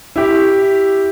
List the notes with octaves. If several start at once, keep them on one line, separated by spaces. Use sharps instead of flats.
E4 G4